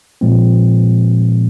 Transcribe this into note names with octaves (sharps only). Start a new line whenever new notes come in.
A#2 F3 G#3 C4